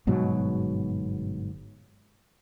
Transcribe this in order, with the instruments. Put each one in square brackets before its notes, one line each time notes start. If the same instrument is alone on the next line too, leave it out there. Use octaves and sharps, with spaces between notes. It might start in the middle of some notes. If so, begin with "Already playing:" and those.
[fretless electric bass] G1 G#2 B2 F#3